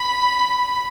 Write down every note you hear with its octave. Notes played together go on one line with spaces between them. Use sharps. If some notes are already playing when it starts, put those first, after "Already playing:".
Already playing: B5